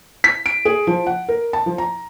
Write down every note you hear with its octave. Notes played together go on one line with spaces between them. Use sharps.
B6
D7
G#4
F3
F#5
A#4
A5
F3
A#5